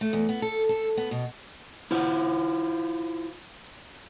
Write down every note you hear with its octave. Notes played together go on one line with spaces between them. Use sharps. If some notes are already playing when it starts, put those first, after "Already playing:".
A3
E2
B3
A4
A4
B3
B2
E4 F4 C5 F#5